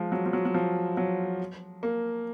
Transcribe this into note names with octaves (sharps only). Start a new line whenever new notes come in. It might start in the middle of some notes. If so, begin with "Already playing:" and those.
Already playing: F3 G#3
F#3
F3
F#3
F#3
F3
F#3
A#3